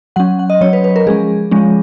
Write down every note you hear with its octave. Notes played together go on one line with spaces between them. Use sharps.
F#3 C#4 F#5
F#5
D#5
F#3 C#4 C#5
B4
B4
A#4
F3 G#3 C#4 G#4
F3 G#3 C#4